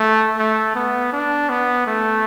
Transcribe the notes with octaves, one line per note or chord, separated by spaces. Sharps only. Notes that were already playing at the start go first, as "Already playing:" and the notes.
Already playing: A3
A3
B3
D4
B3
A3